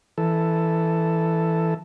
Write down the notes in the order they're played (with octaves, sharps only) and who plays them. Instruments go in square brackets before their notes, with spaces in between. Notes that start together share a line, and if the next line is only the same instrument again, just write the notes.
[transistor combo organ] E3 A4